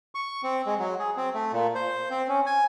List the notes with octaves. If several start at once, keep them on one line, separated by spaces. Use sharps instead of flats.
C#6
C4
G#3
F#3
G#4
C4
A3
A#2
C5
C4
C#4
G#5